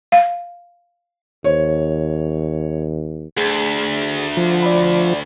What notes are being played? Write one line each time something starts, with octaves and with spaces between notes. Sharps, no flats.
F5
D#2 C5 C#5
D2 G#4
F3
D5 B5